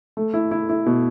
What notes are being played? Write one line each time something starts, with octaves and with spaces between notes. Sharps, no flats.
A3
E4
E4
E4
B2